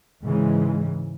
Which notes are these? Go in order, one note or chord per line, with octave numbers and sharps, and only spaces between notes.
G#2 C#3 E3 G#3